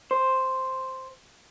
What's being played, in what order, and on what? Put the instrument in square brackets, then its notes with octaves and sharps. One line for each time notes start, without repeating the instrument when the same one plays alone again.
[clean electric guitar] C5